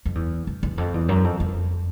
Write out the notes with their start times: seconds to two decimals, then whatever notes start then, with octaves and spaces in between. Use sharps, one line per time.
0.06 F2
0.15 E2
0.47 E2
0.63 E2
0.78 F2
0.94 E2
1.09 F#2
1.24 F2
1.40 F2